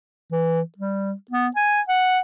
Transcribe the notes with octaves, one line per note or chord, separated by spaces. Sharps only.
E3
G3
B3
G#5
F#5